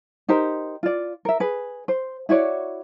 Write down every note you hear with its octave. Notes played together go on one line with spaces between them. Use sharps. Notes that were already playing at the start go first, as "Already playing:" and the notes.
D#4 G4 A#4 C5
F4 D5
A#4 E5
G#4 B4
C5
E4 F#4 C#5 D5